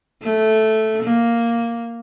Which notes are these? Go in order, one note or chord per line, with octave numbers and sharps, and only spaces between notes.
A3
A#3